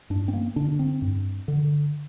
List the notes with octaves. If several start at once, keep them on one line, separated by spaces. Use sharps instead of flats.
G2 D4
C4
A#3
D3 D4
C4
G2
D3